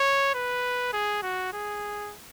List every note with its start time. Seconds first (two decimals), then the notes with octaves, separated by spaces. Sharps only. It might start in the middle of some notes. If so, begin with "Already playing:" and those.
Already playing: C#5
0.35 B4
0.93 G#4
1.22 F#4
1.53 G#4